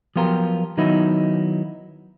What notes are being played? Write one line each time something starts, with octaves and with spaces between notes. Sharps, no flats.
F3 F#3 B3 F4 G4 A#4
D#3 F#3 B3 D#4 E4